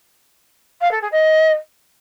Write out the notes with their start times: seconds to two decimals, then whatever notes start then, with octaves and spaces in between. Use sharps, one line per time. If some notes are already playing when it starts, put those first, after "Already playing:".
0.81 F5
0.91 A4
1.01 G#4
1.11 D#5